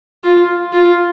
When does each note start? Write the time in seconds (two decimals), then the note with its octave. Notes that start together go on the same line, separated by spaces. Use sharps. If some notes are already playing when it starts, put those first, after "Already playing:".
0.24 F4
0.73 F4